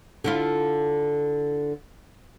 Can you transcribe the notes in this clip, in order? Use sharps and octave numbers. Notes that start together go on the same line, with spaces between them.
D3 E4 F4